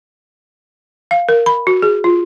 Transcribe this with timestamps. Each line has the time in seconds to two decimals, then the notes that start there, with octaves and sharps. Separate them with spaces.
1.11 F5
1.29 A#4
1.46 B5
1.67 F#4
1.82 G#4
2.04 F4